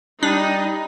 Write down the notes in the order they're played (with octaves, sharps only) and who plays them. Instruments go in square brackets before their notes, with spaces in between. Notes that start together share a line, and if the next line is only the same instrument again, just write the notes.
[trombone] G3 [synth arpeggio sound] D4 [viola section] D#4